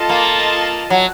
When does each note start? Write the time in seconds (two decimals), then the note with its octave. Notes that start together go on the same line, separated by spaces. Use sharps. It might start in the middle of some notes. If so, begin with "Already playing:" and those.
Already playing: F4 A4 D#5 A5
0.09 A#3
0.90 F#3